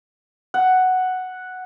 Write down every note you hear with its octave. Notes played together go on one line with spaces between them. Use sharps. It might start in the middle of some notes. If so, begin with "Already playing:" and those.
F#5